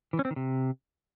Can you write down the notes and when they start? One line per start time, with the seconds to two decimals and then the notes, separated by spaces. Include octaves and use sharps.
0.13 E3
0.19 C#4
0.25 C4
0.31 D#3
0.36 C3